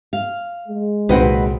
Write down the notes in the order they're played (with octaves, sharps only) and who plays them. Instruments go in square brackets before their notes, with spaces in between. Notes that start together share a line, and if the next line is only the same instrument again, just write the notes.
[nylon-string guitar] F5
[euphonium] G#3
[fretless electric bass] C2 A#2 [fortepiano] D#3 F#3 C4 [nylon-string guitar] B4 D#5 F#5